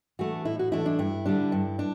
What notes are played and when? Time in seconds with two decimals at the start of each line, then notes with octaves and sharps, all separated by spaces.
0.19 E3 A3 D4 F#4
0.45 A2 E4
0.59 F#4
0.72 E3 A3 D4 E4
0.86 D4
0.99 G2 E4
1.26 D3 G3 D4
1.52 G2
1.79 D4